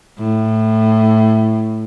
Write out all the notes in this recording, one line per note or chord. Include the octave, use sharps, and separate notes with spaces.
A2